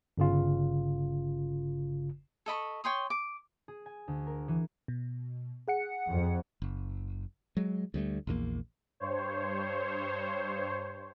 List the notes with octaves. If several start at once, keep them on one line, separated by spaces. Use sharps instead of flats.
G1 C#3 F4
A4 D#5 B5 C#6
C#5 G5 C6 D#6
D6
G#4
G#5
D2
A#4
E3
B2
G#4 F#5 C#7
F2
F#1
F#3 G#3
D2 G3 A3
A#1 E2 C#3 A#3
G2 C5 C#5